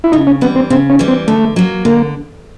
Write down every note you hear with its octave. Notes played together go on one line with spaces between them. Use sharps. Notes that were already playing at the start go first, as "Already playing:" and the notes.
E4
C#3 D#4
C#4
E3 G3 B3
C4
C#3 C4
C#4
E3 G3
C4
D3 A3
F#3 A#3
D3 A#3